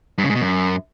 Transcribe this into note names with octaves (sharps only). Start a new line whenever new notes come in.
G2
C#3
G#2
B2
F#2